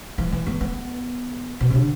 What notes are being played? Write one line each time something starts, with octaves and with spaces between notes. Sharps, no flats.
E3
E3
B3
B3
B2
C3
D3